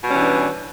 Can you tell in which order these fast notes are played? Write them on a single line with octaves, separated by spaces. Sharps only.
B2 G3 C#4 E3 D4